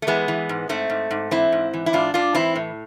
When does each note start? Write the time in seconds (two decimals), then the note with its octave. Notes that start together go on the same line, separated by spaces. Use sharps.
0.02 A3
0.07 E3 G#3 B3
0.28 E3
0.49 G#2
0.69 G#2 A3 C4
0.90 G#2
1.11 G#2
1.31 E3 C4 E4
1.52 G#2
1.73 E3
1.86 E4
1.93 G#2 D4 F4
2.14 G#2 D4 F4
2.35 E3 C4 E4
2.56 A2